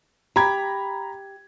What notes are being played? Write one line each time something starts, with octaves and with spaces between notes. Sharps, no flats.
G4 A#5 B5 G#6